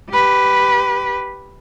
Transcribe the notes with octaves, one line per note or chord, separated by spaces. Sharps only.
G4 B4